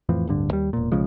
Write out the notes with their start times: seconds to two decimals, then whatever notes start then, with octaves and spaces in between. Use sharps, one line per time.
0.09 F2 A2 E3 F3
0.27 D1 G2 D3
0.51 D#2 G3
0.73 E1 A#2
0.92 B1 C#3 F3 G#3